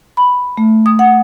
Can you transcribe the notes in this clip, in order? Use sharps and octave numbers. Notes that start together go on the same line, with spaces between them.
B5
A3
D#6
F#5